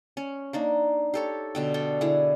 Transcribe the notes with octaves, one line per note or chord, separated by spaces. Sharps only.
C#4
A#3 D4 D#4
G4 A4 C#5
B2 D3 G5
A4 D5 G5
D3 E4 G#4